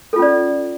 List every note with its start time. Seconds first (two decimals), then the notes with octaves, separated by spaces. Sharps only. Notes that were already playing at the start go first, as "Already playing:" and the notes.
0.13 A4
0.16 F4
0.19 C#4
0.22 D5